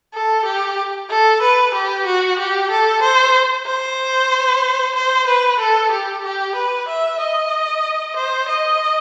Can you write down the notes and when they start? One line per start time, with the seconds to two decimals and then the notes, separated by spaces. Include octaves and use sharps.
0.14 A4
0.45 G4
1.10 A4
1.42 B4
1.74 G4
2.06 F#4
2.39 G4
2.71 A4
3.03 C5
3.67 C5
4.96 C5
5.27 B4
5.59 A4
5.92 G4
6.24 G4
6.55 B4
6.88 E5
7.20 D#5
8.16 C5
8.49 D#5